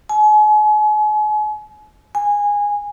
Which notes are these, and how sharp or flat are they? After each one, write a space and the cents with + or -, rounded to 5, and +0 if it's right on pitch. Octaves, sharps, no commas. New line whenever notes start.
G#5 +40
G#5 -15